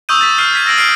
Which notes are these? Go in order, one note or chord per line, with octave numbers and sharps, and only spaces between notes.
C#6 D#6 E6 G6 D#7
A6 B6
F6 C7 D#7
G#6 B6 D#7
E6 A#6 C7 D7 F#7
F6 C7 D7 D#7